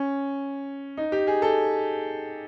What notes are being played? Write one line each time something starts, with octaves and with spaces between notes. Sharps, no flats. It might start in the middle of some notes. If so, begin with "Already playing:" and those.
Already playing: C#4
D#4
G4
G#4
A4